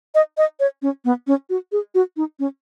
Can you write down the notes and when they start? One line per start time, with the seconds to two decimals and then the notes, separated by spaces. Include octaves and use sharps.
0.15 D#5
0.37 D#5
0.60 C#5
0.82 C#4
1.05 B3
1.27 C#4
1.50 F#4
1.72 G#4
1.95 F#4
2.17 D#4
2.39 C#4